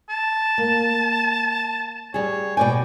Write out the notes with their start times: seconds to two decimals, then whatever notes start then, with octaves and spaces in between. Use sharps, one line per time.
0.10 A5
0.58 A#3
2.14 G3 G#4 C#5
2.57 B2 D5 G5 G#5